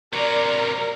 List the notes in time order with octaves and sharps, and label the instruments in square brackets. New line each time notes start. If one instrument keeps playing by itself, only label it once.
[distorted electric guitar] C3 F#3 [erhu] A#4 [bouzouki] D5